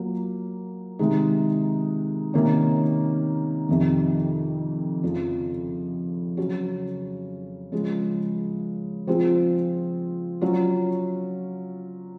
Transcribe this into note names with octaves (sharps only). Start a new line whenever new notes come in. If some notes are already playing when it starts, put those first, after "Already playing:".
Already playing: F#3 A#3 F4 A#4
C3 D#3 G#3 D#4
C3 D#3 A#3 C#4
F2 C3 D#3
F2 C#3 F3
C#3 F#3 C#4 F#4
C#3 F3 G#3
F3 C4 F4 G#4
F#3 C#4 F4